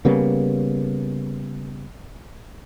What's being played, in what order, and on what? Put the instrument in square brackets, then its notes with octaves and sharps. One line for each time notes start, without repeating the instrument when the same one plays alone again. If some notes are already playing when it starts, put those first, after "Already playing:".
[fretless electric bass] C#3 G3 A#3 B3